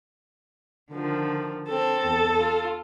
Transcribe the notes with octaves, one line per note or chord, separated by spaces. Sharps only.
D3 D#3 F3
C4 A4
E2
F4